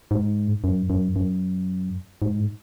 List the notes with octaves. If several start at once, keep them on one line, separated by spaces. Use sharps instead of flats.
G#2
F#2
F#2
F#2
G#2